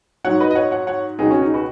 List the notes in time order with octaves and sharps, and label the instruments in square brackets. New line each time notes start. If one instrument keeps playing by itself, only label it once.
[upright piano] G#2 F#3 C#5 F#5
B4 D#5
D#5
C#5 F#5
C#5 F#5
C#5 F#5
C#2 B2 F#3 D#4 G#4
C#4 F#4
D#4 G#4
F#4 B4